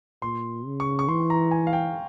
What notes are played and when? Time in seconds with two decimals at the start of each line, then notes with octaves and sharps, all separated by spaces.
0.22 A#2 C6
0.66 C#3
0.80 C#6
0.99 C#6
1.08 E3 C6
1.30 A#5
1.51 G#5
1.67 F5
1.73 G5